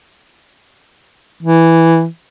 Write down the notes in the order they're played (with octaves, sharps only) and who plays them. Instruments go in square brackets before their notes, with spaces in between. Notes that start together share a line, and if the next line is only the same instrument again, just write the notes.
[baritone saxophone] E3